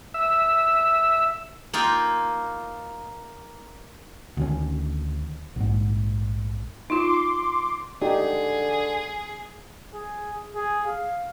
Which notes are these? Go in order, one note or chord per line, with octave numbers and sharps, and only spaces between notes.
E5
A#3 D#4 F4 G5
D2 D#3 C#4
A#1 G#2
D#4 F4 C6 D6
D3 D#4 G4 G#4 D5
G#4
G#4
F5